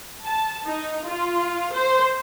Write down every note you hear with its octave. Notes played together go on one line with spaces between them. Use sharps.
A5
D#4
F4
C5